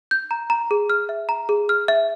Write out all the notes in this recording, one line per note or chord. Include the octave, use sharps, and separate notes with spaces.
G6
A#5
A#5
G#4
F6
E5
A#5
G#4
F6
E5